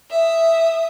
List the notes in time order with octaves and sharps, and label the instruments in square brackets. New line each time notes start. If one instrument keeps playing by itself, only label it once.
[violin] E5 D#6